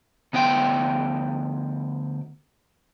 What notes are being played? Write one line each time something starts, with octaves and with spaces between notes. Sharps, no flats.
D2 B3 C5 G5